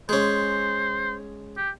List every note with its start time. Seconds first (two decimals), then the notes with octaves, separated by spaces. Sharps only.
0.09 G#3 C#4 C5
1.57 G4